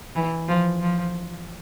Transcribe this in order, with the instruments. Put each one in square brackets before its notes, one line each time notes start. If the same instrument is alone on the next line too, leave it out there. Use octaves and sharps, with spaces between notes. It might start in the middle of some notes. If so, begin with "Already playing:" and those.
[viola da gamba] E3
F3
F3